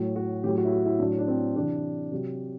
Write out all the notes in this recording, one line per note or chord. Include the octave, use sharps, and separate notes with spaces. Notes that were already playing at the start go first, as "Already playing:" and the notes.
Already playing: A2 F#3
F#4
A2 F#3 G4
F#4
E4
F#4
E4
A2 F#3 D4
D4
C4
C3 E3 D4
C3 F#3